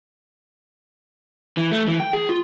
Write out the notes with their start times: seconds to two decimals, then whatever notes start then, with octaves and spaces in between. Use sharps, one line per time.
1.57 E3
1.72 A3
1.88 E3
2.00 G5
2.13 G#4
2.29 F4